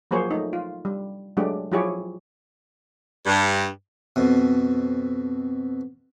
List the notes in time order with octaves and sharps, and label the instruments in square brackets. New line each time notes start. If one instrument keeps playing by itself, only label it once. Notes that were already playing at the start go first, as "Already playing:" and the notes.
[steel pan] F3 F#3 A#3 G#4 C5 C#5
A3 D#4
F4
G3
F#3 G#3 A3 D4 G4
F3 F#3 E4 G4 G#4 C#5
[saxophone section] G2
[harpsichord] F2 B2